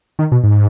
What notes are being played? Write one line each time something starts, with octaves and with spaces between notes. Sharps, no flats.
D#3
B2
G#2